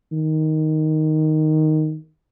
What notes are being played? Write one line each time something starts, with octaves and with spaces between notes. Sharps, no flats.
D#3